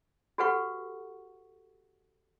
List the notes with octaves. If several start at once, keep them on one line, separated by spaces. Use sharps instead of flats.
F#4 G4 A4 B4 F#5 C#6